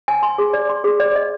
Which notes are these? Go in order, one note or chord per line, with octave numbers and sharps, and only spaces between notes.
G#5
C6
G#4
D5
C6
G#4
D5
D#5